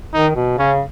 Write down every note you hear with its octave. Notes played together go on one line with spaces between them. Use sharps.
D#3 D#4
B2
C#3 C#4